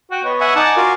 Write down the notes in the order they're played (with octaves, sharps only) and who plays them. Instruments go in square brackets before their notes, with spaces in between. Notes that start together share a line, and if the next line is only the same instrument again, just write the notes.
[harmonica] F#4 G5
B3 C#5 D#5
[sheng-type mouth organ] E5 F#5 G#5
[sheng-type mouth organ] D#4 F#5 A5 [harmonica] D5 G#5
[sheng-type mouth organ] F4 F#4 A#4